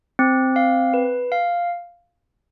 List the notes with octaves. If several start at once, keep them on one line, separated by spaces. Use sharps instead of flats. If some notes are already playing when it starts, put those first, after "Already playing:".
C4
F5
B4
F5